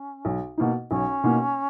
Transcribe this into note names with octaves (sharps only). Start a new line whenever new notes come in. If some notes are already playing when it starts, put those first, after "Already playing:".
Already playing: C#4
B1
B2 A#3 D#4
B1 C#4
B2 A#3 D#4